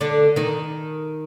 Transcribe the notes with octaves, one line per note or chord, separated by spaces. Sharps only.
D3 D4
D#3 D#4